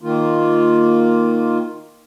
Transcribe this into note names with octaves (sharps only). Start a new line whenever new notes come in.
D#3 A#3 F4